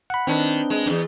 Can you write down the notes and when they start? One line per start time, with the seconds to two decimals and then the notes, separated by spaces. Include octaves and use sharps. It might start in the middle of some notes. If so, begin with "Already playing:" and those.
0.10 F#5 B5
0.27 D#3 C4 D4 B4
0.70 G#3
0.86 E2 G2